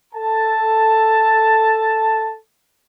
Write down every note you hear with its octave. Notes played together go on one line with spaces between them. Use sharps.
A4 A5